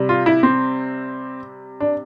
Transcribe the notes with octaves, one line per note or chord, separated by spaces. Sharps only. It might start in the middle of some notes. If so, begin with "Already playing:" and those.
Already playing: C3 G3
F4
E4
C4
D4